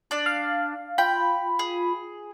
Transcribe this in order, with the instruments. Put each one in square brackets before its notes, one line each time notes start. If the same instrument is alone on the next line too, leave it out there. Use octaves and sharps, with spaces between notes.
[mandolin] D4 D5
[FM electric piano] F5
[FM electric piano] F4 B5 [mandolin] G5
[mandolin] G#4